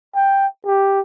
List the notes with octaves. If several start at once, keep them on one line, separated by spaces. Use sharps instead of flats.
G5
G4